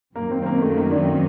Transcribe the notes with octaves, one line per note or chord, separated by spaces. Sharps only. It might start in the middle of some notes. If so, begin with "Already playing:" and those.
F#2 D#3 F#3 A#3
C4
C4
A#3
A3
A#3
D4
C4